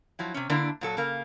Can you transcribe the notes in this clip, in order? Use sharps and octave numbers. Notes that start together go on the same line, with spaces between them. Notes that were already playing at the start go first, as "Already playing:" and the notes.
F3 F#3 E4
C3 C#4
D3 A#3 D4 E4
A#2 F#3 A4
C#3 A#3